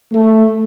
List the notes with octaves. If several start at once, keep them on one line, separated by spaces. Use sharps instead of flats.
A3